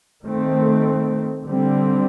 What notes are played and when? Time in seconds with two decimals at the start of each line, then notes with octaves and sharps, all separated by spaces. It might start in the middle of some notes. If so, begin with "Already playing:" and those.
0.24 D#3 A3 C4
1.43 D3 G3 C4